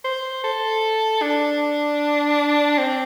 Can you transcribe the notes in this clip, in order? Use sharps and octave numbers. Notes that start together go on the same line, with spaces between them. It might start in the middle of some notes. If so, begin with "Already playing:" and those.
C5
A4
D4
C4